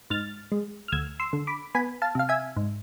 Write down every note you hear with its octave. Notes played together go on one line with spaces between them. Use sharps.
G#2 F6 A6
G#3
F6
D2 E6 G#6
C6 E6
D3
B5 D6
B3 G#5 B5
F5 A5
C3 F5
E5 G#5
G#2